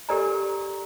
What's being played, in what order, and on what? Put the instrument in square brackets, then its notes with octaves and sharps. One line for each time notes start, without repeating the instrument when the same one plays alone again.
[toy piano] G4 A4 A#4 D5 G#5 A#5